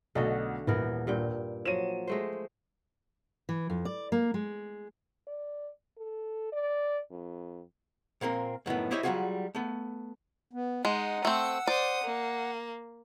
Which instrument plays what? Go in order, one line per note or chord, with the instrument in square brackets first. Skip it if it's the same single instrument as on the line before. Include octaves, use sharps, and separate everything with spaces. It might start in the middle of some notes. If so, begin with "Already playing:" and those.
[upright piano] B1 B2 A3 [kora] D3 F#4 D#5
[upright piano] D#1 [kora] E3 B3 A#4
[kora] G2 A#2 G5
[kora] F3 F#3 [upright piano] D#7 E7
[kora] G#3 A3 C5
[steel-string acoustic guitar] E3
F2
D5
A#3
G#3
[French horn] D5
A4
D5
F2
[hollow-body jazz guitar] A#2 A#3 C4 A#4
F#2 A2 D#3 B3
E4 G4 C5 C#5 D#5 E5
F#3 G3 C4 F4 F#4 G#4
A3 B3
[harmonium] B3
[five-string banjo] G#3 [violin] D#4 [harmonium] F#5
[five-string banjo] A3 C4 [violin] E6
[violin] C5 D#6 [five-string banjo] D5
[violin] A#3